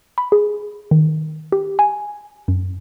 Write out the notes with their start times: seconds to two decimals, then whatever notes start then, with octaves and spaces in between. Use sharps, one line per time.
0.18 B5
0.32 G#4
0.91 D#3
1.52 G4
1.79 G#5
2.48 F#2